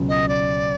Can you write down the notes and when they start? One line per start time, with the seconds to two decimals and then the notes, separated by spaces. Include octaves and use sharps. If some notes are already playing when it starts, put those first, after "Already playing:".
Already playing: C#2 B2 F#3
0.09 D#5
0.28 D5